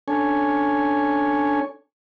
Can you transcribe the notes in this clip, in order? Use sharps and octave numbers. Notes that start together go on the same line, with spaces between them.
C#4 D4 A4 C#5 G#5